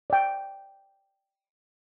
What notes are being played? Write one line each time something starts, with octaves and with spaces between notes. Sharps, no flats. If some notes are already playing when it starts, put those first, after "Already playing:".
D5 G5